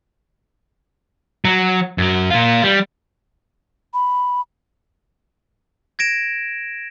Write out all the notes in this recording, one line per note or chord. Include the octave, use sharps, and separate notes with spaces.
F#3
F#2 F#3
A#3 F4
G3
B5
G#6 A#6 D7 E7